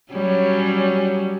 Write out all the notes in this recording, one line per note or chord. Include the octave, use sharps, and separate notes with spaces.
F#3 G3 C#4